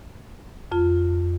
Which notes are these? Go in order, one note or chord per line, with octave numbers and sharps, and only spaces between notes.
F2 F4